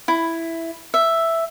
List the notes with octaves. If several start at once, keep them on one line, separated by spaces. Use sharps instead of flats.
E4
E5